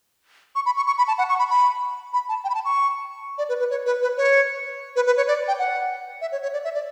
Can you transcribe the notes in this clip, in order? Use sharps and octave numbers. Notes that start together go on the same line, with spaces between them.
C#6
B5
C#6
C#6
B5
A5
F#5
C#6
B5
B5
B5
A5
G5
B5
A5
C#6
D5
B4
B4
C#5
B4
B4
C#5
B4
B4
C#5
D5
G5
F#5
E5
C#5
C#5
D5
E5
D5